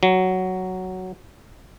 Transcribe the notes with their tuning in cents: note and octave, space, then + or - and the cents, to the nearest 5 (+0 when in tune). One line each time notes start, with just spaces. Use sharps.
F#3 +5